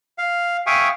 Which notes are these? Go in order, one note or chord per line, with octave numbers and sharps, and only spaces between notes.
F5
E5 F5 G5 G#5 C#6 D#6